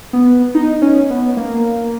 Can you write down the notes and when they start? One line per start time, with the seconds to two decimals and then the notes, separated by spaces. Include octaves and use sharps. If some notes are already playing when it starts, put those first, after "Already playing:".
0.13 B3
0.55 D#4
0.82 C#4
1.10 B3
1.37 A#3